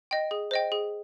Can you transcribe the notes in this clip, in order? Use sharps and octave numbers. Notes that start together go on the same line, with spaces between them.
D#5 G5
G#4
C5 D#5 G5
G#4